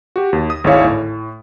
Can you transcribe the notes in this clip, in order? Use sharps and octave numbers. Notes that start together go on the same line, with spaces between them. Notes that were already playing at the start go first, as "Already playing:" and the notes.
F#4 G4
D#2
D#6
G#1 D2 G#3 E4 C#5 F5
A2